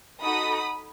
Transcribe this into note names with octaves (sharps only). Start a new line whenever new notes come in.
D#4 F#4 A4 B5 D#6